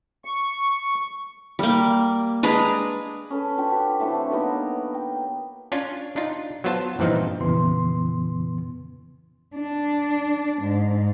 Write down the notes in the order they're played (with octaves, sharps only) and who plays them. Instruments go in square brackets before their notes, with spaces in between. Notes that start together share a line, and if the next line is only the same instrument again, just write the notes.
[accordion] C#6
[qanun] G3 A#3
G#3 D4 B4 A#5
[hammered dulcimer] C#4 A4 B4
D4 F4 G5 B5
F#4 G4 B4
E3 A3 C4 D4
D#3 F#3 A#3 B3
G5
[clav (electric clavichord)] C#4 D4 F4 G#5
D4 D#4 F4
F#3 B3 F4 C5 A5
G2 A#2 E3 F3 C4 D#4
[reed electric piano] F2 A#2 C#3 E3 B3 C6
[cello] D4
G#2